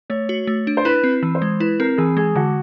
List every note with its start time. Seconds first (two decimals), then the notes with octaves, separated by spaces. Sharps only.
0.10 A3 C#5
0.29 F#4
0.47 A3
0.67 D4
0.77 C5
0.85 E4 B4
1.04 C4
1.23 E3
1.35 C5
1.42 G#3
1.60 E4 B4
1.80 C4 A#4
1.98 E3 G#4
2.17 G#3 G#4
2.36 D3 F#4